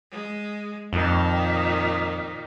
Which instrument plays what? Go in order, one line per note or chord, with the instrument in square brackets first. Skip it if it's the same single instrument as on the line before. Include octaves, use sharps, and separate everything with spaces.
[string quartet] G#3
[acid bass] F2 [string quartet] A#2 D#3